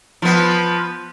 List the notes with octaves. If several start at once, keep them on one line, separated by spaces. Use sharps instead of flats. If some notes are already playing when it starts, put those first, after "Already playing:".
F3 B3